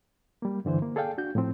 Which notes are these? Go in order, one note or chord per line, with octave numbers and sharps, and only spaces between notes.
G3 A#3
G2 D3 E3 C5
A#3
G#4 A4 D5 F5 G5
D4 F#4 G6
A2 F3 C4